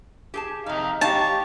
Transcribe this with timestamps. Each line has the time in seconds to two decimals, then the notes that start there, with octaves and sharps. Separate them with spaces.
0.34 G4 G#4 A5
0.66 F2 C3 D#4 F5
1.01 D#4 G4 C#5 D#5 F5 A5